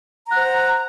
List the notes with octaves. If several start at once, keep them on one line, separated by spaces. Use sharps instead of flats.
C5 F#5 A#5